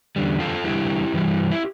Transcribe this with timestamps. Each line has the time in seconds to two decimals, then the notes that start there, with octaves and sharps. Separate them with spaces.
0.16 E2 D3 G3
0.40 F4 A4
0.64 E2 D3 G3 E4 G4
1.13 G2 E3 G3
1.51 E4